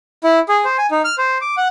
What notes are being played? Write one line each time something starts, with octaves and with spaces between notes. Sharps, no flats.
E4
G#4
C5
G#5
D#4
F6
C5
D6
F#5